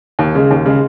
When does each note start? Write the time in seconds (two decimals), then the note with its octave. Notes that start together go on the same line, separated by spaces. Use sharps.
0.19 D#2
0.35 C#3 G#3
0.51 D#2
0.65 C#3 G#3